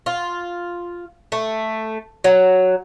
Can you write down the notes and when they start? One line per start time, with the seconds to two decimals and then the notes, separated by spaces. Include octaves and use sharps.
0.06 F4
1.32 A3
2.24 F#3